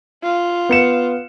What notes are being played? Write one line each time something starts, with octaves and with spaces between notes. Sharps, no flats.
F4
B3 C#7 E7